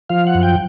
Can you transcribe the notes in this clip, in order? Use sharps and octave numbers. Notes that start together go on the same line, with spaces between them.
F3 F5
F#5
F#2
G5